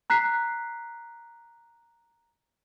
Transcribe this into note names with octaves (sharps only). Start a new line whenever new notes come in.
A#5 F#6 B6 C7